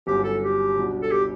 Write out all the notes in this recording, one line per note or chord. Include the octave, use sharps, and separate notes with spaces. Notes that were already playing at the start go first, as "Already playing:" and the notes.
G1 G2 F#3 C#4 G4
A4
G4
C#2 B2 G3 D4 F#4
A4
G4